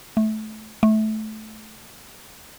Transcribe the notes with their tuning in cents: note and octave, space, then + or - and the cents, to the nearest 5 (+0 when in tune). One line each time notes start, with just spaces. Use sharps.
A3 -20
A3 -20